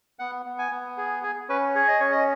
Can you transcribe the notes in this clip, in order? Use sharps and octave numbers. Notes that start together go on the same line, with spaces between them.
B3 F#5
B3
G#5
B3
G#4
G#4
C#4 B4
G#4 C#5
D#5
C#4 C#5
D#5